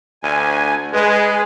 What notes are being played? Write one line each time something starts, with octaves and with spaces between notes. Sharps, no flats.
D2 G#5
G#3 G#4 B4